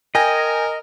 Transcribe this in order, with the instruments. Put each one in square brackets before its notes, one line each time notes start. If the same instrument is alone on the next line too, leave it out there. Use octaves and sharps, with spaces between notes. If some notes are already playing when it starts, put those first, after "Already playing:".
[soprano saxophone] A#4 [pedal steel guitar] D#5 [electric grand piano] G5 G#5 A#6